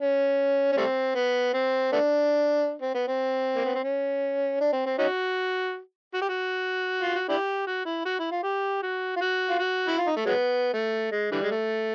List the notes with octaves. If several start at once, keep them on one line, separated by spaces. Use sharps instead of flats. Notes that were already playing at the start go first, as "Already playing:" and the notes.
C#4
C#4
G3 A3 C4
B3
C4
A3 B3 D4
C4
B3
C4
A#3
B3
C4
C#4
D4
C4
C4
C#4 D#4 F#4
F#4
G4
F#4
F4
F#4
D4 E4 G4
F#4
E4
F#4
E4
F4
G4
F#4
F4
F#4
F4
F#4
E4
F4
D#4
A3
F#3 G#3 B3
A3
G#3
D3 E3 G3
G#3
A3